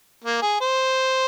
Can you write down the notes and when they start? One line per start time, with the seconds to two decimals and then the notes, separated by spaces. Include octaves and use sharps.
0.24 A#3
0.42 G#4
0.61 C5